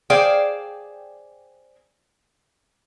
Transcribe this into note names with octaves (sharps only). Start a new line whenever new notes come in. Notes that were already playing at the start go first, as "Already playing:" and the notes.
G#4 C5 D5 F5 G5